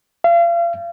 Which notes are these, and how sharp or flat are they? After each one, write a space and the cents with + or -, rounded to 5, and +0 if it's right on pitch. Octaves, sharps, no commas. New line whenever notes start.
F5 -35